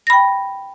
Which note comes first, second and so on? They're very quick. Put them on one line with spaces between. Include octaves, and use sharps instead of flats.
A#6 B5 G5